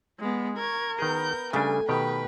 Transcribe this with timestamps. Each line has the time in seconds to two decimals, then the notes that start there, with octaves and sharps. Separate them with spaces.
0.19 G#3 B3
0.58 A#4 C#6 G#6
0.99 D#3 B3 G#4 G6
1.53 C#3 G3 A3 D4 G#5
1.89 B2 D#3 G4 B4 G5